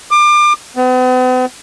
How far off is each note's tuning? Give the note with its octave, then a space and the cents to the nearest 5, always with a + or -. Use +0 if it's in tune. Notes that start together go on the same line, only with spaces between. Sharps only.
D6 +30
B3 +45